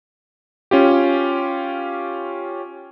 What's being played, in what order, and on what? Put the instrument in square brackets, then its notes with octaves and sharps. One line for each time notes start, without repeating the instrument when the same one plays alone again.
[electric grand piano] C#4 F4 G4